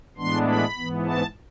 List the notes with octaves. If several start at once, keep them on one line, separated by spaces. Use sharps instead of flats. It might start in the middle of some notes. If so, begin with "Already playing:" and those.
A2 E3 G#3 B3 D4 C6
B5
G#2 E3 B3
A5